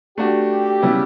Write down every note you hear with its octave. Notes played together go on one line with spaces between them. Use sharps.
A3 D4 F#4 G4
C#3 G3 B3 E4